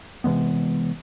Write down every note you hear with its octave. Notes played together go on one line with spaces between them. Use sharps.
C3 E3 G#3 B3